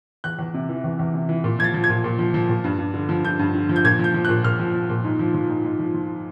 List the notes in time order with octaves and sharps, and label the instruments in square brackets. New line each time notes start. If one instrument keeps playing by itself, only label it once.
[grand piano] E2 F#6
E2
C3
E3
E2
E2
C3
E3
A#2
F3 G#6
A6
F3
G#6
A#2
A#2
F3
F3
A#2
G2
G2
D3
F3
G2 G6
G2
D3
F3
G6
A#2 G#6
F3
G6
F3
F#6
A#2
A#2 F6
F3
F3
A#2
G#2
F3
F3
G#2
G#2
F3
F3